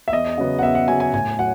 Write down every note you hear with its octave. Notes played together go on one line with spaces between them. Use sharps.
E5
E2 D#5
C#3 F#3 B3
F#5
E2 E5
F#5
C#3 F#3 B3 G#5
G#5
A2 G#5
F#3 F#5